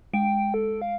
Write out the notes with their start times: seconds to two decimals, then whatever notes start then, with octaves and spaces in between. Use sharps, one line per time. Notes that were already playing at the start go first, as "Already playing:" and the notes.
0.14 G#3 G5 D7
0.54 A4
0.82 F5